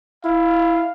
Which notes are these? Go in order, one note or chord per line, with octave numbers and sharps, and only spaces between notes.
E4 F5